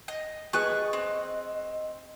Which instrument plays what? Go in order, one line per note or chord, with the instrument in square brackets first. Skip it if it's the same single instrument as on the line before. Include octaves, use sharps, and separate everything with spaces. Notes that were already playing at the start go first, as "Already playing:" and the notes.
[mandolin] D#5
[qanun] G#4 B4 A5 [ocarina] D#5 [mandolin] C#6 F#6
[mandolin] C4